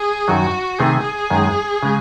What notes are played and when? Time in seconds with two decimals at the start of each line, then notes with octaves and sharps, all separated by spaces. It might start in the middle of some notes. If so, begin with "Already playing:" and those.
Already playing: G#4
0.28 F#2 D#3 F#3 F#4
0.79 C3 D#3 A3 C4 D#4 G#4
1.30 F#2 D#3 G#3
1.83 C#3 G#3